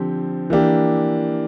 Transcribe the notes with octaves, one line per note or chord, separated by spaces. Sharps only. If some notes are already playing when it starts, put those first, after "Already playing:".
Already playing: D3 F3 C4 G4
E3 A#3 D4 G4